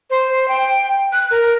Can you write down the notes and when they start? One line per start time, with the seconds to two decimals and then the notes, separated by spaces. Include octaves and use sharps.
0.10 C5
0.48 G5
1.13 F#6
1.31 A#4